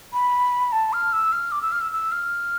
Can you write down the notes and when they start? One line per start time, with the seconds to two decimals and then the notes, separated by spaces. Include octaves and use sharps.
0.13 B5
0.72 A5
0.93 F6
1.13 E6
1.32 F6
1.52 D6
1.62 E6
1.72 F6
1.81 E6
1.92 E6
2.12 F6